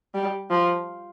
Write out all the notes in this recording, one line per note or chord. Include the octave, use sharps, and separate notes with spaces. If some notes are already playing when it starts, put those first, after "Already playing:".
G3
F3